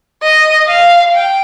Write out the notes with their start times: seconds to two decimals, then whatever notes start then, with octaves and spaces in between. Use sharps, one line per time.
0.23 D#5
0.68 F5
1.13 G5